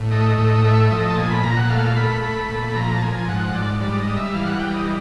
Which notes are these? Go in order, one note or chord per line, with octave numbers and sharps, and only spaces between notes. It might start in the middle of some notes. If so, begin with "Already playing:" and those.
Already playing: A2
A3 D#5
A2 D#5
A3 E5
F3 D#5
A5
A#2 G#5
B5
A#2 A#5
F#5
A3 F5
A3 B5
A3 B5
A#2
F3 A#5
A5
F3 G#5
G#2 F#5
G#2 D5
G3 D5
D#5
G3
E5
E3 F5
F#5
G3 G5
D#5